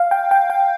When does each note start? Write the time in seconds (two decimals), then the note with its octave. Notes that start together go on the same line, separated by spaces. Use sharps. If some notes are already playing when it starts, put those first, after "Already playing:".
Already playing: F5
0.11 G5
0.31 G5
0.50 G5